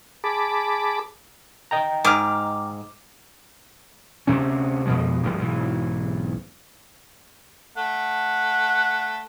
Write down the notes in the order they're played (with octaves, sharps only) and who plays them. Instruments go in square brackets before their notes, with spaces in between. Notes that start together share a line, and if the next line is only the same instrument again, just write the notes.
[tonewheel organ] G#4 A5 B5 D6
[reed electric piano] D#5 G5 A#5
[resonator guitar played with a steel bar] G#2 [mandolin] D6 F6
[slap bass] D2 C3 C4 C#4
F2 B2 F3 G#3
C#2 G2 F3 A#3
B1 G#2 E3
[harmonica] A3 F#5